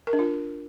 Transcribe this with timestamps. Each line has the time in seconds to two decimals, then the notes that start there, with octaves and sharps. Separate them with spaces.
0.07 A#4
0.13 D4
0.19 F4